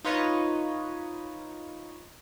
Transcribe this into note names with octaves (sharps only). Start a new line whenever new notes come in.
D#4 F4 B4 C#5 D#5